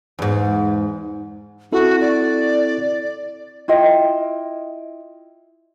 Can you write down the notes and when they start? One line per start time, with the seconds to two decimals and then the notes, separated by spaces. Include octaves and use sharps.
0.19 E2 G#2
1.72 C4 E4 F#4 A4
2.01 D5
3.68 E4 F4 D#5 G5